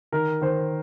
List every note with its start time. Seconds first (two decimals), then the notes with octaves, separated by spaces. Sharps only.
0.12 D#3 A#4
0.41 D#3 C5